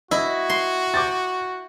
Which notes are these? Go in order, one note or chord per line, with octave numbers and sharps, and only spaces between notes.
E4 F#4 D#5
C6
D6 G6 A6